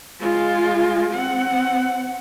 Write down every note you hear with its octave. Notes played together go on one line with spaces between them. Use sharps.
G#3 F4
C4 F#5